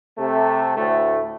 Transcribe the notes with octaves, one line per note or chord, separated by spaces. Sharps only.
C3 A3
D2 A2 A3